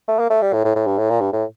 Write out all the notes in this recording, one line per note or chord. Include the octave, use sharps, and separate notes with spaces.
A3
A#3
A3
G3
A2
A2
A2
G2
A2
A#2
G2
A2